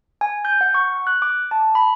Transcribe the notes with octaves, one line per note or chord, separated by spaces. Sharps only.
G#5
G6
F#5
C#6
F#6
D6
A5
B5